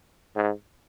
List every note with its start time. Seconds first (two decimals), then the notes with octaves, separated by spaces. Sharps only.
0.36 G#2